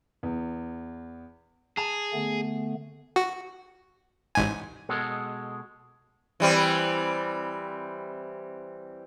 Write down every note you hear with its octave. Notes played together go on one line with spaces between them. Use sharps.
E2
G#4 A5 E7 F7
D3 A3 B3
F#4
A1 G#2 G#5
B2 G#3 A4
E3 G3 C4